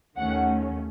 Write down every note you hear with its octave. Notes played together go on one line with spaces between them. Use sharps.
D#2 D#3 A3 C#4 F#5